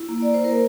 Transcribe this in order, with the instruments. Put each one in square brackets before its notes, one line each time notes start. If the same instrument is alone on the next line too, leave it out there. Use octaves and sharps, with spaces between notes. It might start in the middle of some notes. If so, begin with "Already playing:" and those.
Already playing: [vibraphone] E4
A#3
D5
C5
A#4
A#3